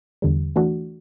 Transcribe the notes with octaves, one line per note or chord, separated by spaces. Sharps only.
E2 D3 G3
E3 A3 D4 F#4